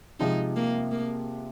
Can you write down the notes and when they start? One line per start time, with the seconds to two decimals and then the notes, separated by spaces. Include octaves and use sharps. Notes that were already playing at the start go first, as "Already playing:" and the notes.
0.19 C3 F3 G#3 D#4
0.56 A#3
0.91 A#3